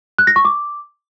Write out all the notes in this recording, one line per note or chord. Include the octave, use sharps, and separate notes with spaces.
F#6
A#6
C#6
D6